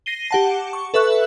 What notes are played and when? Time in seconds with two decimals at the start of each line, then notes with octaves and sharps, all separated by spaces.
0.06 A#6 C7 D#7 G7
0.31 G4 F#5 A5
0.73 C#6
0.94 A4 B4 E5 C#6 F#6